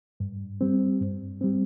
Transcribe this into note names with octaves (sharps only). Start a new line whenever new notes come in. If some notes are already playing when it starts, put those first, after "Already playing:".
G2
G3 C4
G2
G3 C4